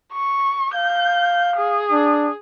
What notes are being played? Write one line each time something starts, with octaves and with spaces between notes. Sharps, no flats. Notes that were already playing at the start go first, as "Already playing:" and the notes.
C#6
F5 G6
G#4
D4